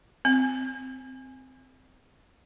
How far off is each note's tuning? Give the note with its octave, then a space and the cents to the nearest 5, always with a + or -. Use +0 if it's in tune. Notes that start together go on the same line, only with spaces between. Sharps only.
C4 -15